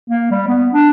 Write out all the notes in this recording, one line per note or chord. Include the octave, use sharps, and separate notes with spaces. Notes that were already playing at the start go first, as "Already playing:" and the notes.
A#3
G3
B3
D4